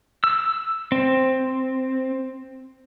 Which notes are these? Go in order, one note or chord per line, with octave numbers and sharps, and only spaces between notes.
E6
C4